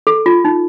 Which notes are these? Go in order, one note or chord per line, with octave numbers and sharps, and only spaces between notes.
A4
F4
D#4